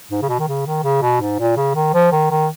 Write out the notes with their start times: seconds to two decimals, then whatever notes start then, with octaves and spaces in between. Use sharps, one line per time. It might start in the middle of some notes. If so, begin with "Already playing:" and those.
0.11 G#2
0.22 C#3
0.29 B2
0.39 D#3
0.48 C#3
0.66 D#3
0.83 C#3
1.02 B2
1.21 G#2
1.39 A#2
1.57 C#3
1.75 D#3
1.94 F3
2.12 D#3
2.31 D#3